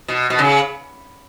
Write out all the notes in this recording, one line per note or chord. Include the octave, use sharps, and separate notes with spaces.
B2
B2
C#3